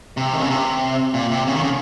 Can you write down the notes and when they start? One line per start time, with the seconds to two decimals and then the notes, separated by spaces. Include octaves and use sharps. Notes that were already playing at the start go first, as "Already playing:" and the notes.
0.17 C3
0.33 D#3
0.41 C#3
0.50 C3
1.14 A#2
1.31 C3
1.47 C#3
1.55 D#3
1.63 C#3